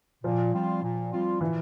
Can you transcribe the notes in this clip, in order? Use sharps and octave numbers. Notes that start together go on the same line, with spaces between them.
A#2 F3
G3 C4 F4
A#2
G3 C4 F4
A#2 E3